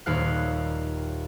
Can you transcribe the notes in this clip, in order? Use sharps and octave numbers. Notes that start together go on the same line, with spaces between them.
D#1 D#2 C#5 D5 F5 F#6